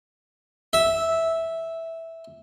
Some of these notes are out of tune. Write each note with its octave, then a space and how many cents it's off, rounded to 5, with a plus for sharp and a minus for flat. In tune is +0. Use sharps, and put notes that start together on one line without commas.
E5 -5